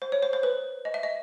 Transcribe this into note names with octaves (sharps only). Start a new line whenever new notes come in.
C5
C#5
C5
C5
B4
D#5
E5
D#5